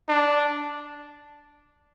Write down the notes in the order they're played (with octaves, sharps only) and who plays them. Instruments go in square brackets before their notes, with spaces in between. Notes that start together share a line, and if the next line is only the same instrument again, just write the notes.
[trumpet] D4